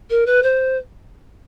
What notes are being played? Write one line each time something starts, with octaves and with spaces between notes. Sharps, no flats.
A#4
B4
C5